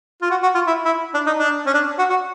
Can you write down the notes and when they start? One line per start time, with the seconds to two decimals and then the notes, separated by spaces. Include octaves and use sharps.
0.22 F4
0.30 F#4
0.43 F#4
0.55 F4
0.67 E4
0.85 E4
1.14 D4
1.26 D#4
1.38 D4
1.66 C#4
1.74 D4
1.98 F#4
2.10 F#4